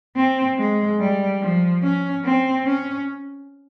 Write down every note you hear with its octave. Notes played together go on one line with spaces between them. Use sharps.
C4
G#3
G3
F3
C#4
C4
C#4